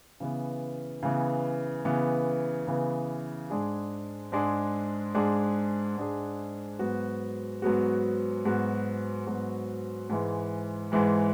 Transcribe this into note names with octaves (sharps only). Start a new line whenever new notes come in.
C#3 E3 B3
C#3 E3 B3
C#3 E3 B3
C#3 E3 B3
G#2 G#3 D4 G#4
G#2 G#3 D4 G#4
G#2 G#3 D4 G#4
G#2 G#3 D4 G#4
G#2 F#3 B3 F#4
G#2 F#3 B3 F#4
G#2 F#3 B3 F#4
G#2 F#3 B3 F#4
G#2 E3 G#3
G#2 E3 G#3